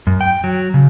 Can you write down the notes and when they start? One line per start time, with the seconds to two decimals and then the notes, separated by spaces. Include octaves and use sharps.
0.07 F#2
0.21 G5
0.44 F#3
0.74 C#3